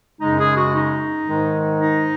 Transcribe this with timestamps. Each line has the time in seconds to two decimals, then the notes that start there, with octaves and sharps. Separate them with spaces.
0.19 F#2 C#3 G#3 D#4
0.37 G#4
0.54 F#4
0.72 D#4
1.25 G#2 D#3 G#3
1.78 D#4